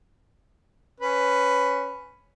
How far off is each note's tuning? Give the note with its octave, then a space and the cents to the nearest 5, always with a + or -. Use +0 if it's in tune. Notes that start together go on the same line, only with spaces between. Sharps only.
C#4 +5 B4 +10